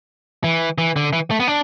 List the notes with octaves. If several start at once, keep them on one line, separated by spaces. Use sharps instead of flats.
E3
E3
D3
E3
A3
B3
D4